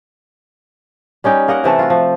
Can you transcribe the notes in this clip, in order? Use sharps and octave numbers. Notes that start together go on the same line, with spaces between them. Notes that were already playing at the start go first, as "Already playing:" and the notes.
G3 C#4 D#4 G5
A#3 A#4 D#5 F#5
C3 E3 A3 A4
F4 F#4
F3